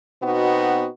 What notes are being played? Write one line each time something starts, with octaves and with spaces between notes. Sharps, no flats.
B2 B3 C4 D#4 F#4